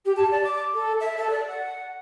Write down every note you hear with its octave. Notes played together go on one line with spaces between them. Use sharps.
G4
A5
D5
D6
A4
E5
A4
D5
F#5